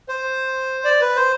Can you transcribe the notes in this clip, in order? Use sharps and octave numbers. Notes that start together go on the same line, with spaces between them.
C5
D5
B4
C5